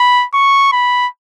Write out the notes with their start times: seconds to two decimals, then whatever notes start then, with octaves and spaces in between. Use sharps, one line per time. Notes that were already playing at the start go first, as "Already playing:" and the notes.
Already playing: B5
0.34 C#6
0.72 B5